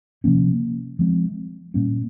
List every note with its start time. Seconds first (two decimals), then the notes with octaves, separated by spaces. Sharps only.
0.24 C3 F3 A#3 C#4
0.99 F3 G#3 C4
1.74 A#2 G3 A#3 C#4